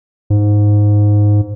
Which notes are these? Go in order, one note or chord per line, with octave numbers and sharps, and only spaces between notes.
G#2